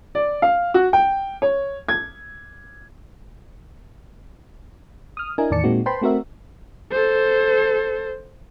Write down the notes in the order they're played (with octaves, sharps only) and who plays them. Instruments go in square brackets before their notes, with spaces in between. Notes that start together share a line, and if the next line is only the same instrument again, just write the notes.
[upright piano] D5
F5
F#4
G5
C#5
G#6
[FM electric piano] D#6 F6
D4 E4 A#4 D#5 G#5
E2 A2 D#3 D5 A5 C#7
A#2 G#3 A#3 C4 D#4 F#4
B4 C5 G5 A5 B5 C6
A3 C4 F#4 A#4 E5
[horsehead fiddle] A4 C5